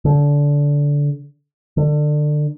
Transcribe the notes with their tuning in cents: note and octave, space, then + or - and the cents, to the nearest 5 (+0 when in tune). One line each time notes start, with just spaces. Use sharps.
D3 -20
D3 +25